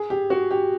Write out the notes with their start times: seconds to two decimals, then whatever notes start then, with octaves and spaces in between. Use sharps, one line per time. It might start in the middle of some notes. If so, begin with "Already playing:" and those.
Already playing: G#4
0.10 G4
0.30 F#4
0.51 G4